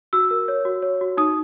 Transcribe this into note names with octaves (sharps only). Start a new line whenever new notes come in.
F#4 E6
A#4
C#5
F#4
C#5
F#4
D#4 D#6